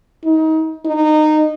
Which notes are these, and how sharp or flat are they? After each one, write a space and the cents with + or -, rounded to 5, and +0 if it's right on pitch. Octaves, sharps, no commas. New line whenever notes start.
D#4 +25
D#4 -20